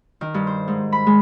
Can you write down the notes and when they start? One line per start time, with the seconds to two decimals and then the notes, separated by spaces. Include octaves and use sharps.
0.21 D#3
0.34 G2
0.47 C5
0.68 G#2
0.92 B5
1.07 G#3